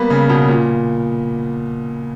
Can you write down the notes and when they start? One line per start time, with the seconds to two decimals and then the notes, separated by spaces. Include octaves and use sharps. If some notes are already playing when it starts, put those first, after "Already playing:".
Already playing: G3 A#3 B3
0.10 C#3
0.29 B2
0.48 A#2